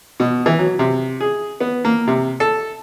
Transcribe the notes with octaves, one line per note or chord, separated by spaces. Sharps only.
B2
E3
F#3
C3
G#4
B3
A#3
C3
A4